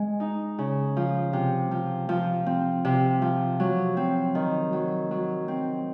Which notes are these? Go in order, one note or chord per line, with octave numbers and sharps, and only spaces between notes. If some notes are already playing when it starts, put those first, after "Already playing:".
Already playing: G#3
D#4
C#3
F3
C3
F3
F3
C4
C3
F3
F#3
C4
D#3
F#3
F#3
C4